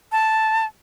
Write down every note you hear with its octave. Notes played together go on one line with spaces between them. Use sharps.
A5